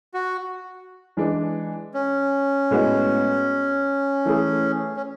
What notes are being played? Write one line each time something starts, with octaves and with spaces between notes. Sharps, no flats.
F#4
E3 G#3 D4
C#4
A2 G#3 B3 F#4
E3 A3 E4 G#4
C#4